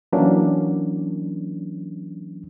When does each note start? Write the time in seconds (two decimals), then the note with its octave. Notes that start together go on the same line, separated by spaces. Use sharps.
0.13 E3 F#3 A#3 C#4 D4